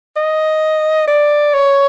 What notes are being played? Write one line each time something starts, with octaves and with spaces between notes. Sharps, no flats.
D#5
D5
C#5